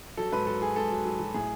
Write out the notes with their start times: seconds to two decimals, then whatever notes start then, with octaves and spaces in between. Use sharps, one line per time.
0.17 F#3 A4
0.32 G#2 B4
0.47 F#3 A4
0.62 F#3 G#4
0.76 G#2 A4
0.91 F#3
1.05 F#3
1.20 F#3
1.34 A2 G#4